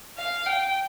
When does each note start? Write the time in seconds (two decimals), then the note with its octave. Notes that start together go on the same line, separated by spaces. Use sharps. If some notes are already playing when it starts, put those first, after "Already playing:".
0.17 F5
0.46 G5